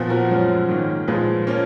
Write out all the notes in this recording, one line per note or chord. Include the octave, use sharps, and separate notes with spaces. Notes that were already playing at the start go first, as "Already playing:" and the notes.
Already playing: A#2 F3 B3
F#4 A#4
F#2 F3 G#3 C#4
G#2 D#3 A#3 C#4
A#2 F3 G#3 G#4 B4
F3 A#3 C#4